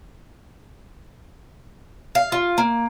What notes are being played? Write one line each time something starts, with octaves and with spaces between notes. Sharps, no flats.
F5
F4
A#3